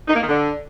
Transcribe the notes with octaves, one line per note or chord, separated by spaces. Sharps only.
D#4
A#3
D#3
D3